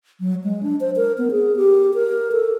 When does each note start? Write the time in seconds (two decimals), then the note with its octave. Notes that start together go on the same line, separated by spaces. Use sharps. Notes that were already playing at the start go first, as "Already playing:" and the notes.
0.20 F#3
0.44 G#3
0.63 D4
0.80 C5
0.96 A#4
1.18 B3
1.31 G#4
1.56 G4
1.94 A#4
2.32 A4